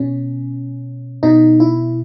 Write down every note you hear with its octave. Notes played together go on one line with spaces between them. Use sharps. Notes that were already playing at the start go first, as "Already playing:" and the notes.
Already playing: B2 C#4
B2 D#4
E4